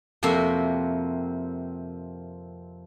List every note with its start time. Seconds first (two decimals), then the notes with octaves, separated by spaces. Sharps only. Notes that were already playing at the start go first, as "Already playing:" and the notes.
0.23 F2 C3 A#3 F#4 E5